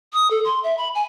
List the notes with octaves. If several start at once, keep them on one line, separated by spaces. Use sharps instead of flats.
D#6
A4
C6
E5
B5
G#5